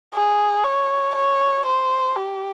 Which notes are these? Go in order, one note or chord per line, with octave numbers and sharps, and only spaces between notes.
G#4
C#5
C#5
C5
G4